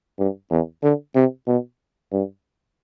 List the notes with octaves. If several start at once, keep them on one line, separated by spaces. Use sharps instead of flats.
G2
E2
D3
C3
B2
G2